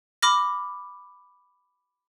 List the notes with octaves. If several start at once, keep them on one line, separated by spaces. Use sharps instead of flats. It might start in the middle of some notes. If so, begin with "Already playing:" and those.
B5 D6 F6 A#6